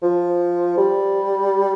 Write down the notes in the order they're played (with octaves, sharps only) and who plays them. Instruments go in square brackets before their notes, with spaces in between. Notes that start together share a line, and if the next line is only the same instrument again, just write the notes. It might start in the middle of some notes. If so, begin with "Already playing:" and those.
[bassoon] F3
G3